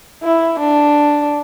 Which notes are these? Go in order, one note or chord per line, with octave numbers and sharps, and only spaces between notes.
E4
D4